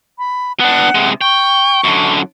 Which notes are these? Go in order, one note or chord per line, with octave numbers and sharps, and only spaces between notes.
B5
B3 D4 F#5
C3 G#3
G5 C#6
F#2 D3